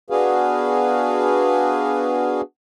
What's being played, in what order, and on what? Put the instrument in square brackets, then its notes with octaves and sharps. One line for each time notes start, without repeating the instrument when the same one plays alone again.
[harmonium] B3 D4 F#4 G#4 B4 F5